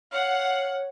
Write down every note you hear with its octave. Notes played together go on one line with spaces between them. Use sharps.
C#5 F5 F#5